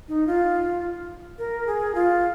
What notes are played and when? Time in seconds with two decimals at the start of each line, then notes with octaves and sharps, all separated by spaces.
0.08 D#4
0.27 F4
1.39 A#4
1.67 G#4
1.95 F4